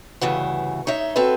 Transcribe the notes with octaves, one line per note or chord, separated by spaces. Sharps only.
D2 G2 C#3 E3 F#5
D#4 C#5 E5
C4 F#4 A4 B4